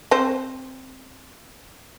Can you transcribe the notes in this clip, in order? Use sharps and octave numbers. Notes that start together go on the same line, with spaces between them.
C4 C5